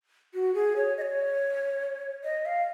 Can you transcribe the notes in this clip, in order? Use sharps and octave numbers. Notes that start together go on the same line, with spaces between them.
F#4
G#4
C#5
D#5
C#5
D#5
F5